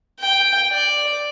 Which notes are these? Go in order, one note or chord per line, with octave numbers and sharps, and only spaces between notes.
G5
D5